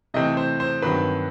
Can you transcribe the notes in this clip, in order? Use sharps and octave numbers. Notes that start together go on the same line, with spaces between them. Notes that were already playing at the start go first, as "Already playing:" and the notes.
C3 E3 A3 C4 D#5
C5
C5
G2 D#3 F#3 C4 B4